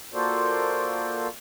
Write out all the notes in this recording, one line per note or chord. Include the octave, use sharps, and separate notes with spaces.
A#3 F4 F#4 A4 C5 D5